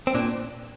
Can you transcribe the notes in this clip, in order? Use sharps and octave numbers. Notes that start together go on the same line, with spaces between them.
C4
A#2 D4